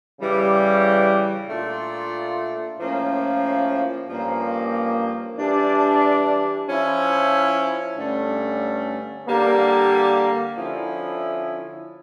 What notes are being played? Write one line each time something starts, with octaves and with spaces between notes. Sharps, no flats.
C#3 E3 G3
A#2 A3 D4 F4
A2 F3 A#3 C#4
G2 F3 A#3 C#4
E3 G3 D4
F3 C#4 E4
G2 D3 A3 C#4
D3 G3 A#3
D3 F3 C#4 E4